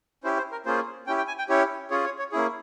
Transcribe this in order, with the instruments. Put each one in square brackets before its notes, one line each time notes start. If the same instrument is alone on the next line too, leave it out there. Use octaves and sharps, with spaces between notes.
[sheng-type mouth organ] C#4 E4 G4 C5
C5
A#4
A#3 C#4 F4 G#4 C5
C#4 E4 G4 G5
G5
G#5
G5
C#4 E4 G4 C#5
C#4 F4 G#4 C#5
C#5
C#5
A#3 C#4 E4 G#4